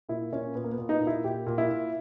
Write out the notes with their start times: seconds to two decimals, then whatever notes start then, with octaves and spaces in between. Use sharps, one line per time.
0.09 A#2 E4
0.32 A#2 C#4
0.55 A#2 B3
0.64 A#3
0.72 B3
0.78 A#2
0.89 D#4
1.00 A#2
1.07 E4
1.24 A#2 G4
1.46 A#2
1.58 E4
1.70 A#2